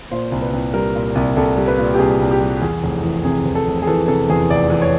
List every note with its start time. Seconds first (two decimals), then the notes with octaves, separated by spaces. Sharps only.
0.11 A#2 C5
0.32 C2
0.42 B4
0.53 C2
0.74 G3 A#4
0.95 A#2
1.15 C2
1.36 C2 A4
1.57 G3
1.68 B4
1.78 A#2
1.94 G4
1.98 C2 G#4
2.20 C2
2.31 G4
2.41 G3
2.61 E2 G#4
2.83 F1
3.03 E3
3.24 C3 G#4
3.45 E2
3.55 A4
3.66 F1
3.82 G#4
3.87 E3 A4
4.08 C3 A4
4.29 E2 G#4
4.50 F1 D5
4.70 E3
4.82 C#5